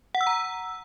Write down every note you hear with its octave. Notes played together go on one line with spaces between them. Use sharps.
F#5
E6
A#5